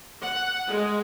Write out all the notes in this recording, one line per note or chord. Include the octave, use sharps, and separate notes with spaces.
F#5
G#3